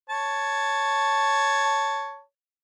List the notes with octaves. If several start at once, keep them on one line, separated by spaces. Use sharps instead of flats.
C#5 A5